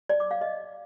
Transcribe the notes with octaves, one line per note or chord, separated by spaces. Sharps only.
D5
D6
F5
D#5